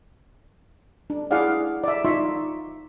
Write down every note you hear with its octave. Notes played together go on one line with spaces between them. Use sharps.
D4
E4 G#4 D5 F5 F#5
D5 E5
D#4 F4 D5 E5 C6 C#6